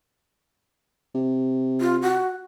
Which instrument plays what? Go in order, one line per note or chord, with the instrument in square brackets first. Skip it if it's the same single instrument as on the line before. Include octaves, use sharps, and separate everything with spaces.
[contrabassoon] C3
[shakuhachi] F4
F#4